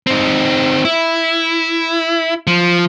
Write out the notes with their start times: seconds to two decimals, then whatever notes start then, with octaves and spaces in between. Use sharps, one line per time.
0.07 C4 D#4
0.85 E4
2.47 F3